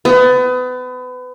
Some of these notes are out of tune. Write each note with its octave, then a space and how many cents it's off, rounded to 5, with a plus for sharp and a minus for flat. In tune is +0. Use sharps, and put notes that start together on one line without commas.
B3 +30